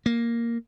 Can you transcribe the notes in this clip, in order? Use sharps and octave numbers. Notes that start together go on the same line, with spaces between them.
A#3